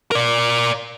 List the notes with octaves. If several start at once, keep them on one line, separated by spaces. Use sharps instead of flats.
A#4 D5